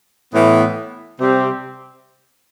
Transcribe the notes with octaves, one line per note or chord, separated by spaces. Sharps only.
A2 E3 B3
C3 G3 C4 G4